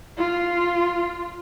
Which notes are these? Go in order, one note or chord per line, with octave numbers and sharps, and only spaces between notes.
F4